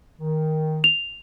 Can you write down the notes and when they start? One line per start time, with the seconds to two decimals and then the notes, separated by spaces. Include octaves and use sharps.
0.19 D#3
0.84 F7